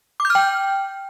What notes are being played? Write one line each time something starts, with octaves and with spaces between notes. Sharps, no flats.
D6
G6
F6
G5